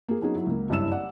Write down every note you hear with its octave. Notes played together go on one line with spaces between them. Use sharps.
A#3 G#4
F#3 B3 C#4 D#4 F#4 G#4
F#3 E4
C#2 A#3
F#1 G2 C#4 E4 E6 E7
D5 F#5